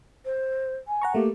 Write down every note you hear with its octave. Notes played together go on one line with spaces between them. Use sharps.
C5
G#5
F#5 A#5 C#6
A3 A#3 G4